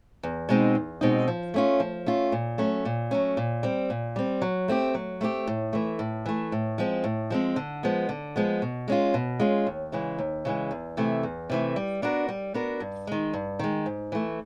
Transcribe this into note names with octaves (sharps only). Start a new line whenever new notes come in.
E2
B2 G#3 C4 D#4
E2
B2 G#3 C4 D#4
F3
A3 C#4 F4
F3
A3 C#4 F4
A#2
F#3 A3 C#4
A#2
F#3 A3 C#4
A#2
G3 C4
A#2
G3 C4
F#3
A3 C4 E4 G4
F#3
A3 C4 E4 G4
A2
E3 A3
A2
E3 A3
A2
F3 G#3 C4
A2
F3 G#3 C4
D3
F3 G#3 B3
D3
F3 G#3 B3
B2
G#3 C#4 F4
B2
G#3 C#4 F4
D#2
C#3 E3 G#3
D#2
C#3 E3 G#3
E2
C3 E3 A3
E2
C3 E3 A3
G3
B3 D4 F#4 A#4
G3
B3 D4 F#4 A#4
G2
D#3 G#3
G2
D#3 G#3
G#2
E3 A3